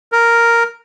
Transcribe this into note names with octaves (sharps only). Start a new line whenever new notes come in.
A#4